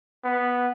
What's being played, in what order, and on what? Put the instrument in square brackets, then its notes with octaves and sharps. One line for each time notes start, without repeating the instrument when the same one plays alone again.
[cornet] B3